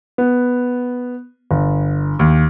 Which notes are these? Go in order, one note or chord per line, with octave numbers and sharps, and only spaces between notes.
B3
G1
D#2